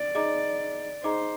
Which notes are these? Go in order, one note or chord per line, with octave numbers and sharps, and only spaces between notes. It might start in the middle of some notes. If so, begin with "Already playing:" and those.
Already playing: D5
D#4 G#4 D#5 A#5 D6
D#4 G#4 C5 D#5 A#5 D6